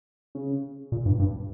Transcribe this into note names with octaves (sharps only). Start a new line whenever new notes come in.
C#3
A#2
G2
G2